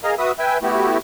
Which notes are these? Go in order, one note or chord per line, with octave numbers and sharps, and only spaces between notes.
G#4 A#4 D#5 F5 A#5
F#4 B4 E5 D#6
B4 E5 G5 G#5
A3 B3 E4 F#4 G4